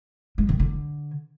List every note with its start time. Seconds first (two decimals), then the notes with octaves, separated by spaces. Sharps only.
0.38 G#3
0.49 D#3
0.60 D3